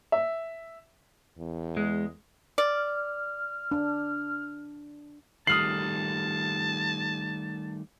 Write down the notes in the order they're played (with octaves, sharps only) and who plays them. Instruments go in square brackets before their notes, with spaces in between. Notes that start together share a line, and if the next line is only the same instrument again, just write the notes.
[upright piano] E5
[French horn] E2
[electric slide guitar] G#3
[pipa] D5 [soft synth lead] F6
[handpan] D4
[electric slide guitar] D#3 G3 A3 [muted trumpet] A5 [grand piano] D#6 F6 F#7 [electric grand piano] C7